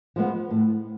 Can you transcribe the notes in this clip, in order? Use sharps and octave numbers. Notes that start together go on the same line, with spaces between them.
F3 G#3 B3
A2